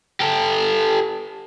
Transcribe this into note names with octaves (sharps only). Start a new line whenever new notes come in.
G4 A4